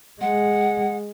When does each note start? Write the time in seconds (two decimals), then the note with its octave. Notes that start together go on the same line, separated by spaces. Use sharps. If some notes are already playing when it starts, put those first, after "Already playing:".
0.21 G#3 F#5